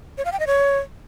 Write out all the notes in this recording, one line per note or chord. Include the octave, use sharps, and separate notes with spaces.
C#5
F5
G5
D#5
C#5